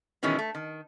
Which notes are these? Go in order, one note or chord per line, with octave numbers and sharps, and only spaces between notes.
B2 D#3 E3 G#3 C#4
A3
D#3